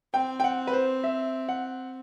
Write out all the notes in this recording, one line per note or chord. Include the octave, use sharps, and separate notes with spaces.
C4 G5
G5
F#5
B4
C5
E5
F#5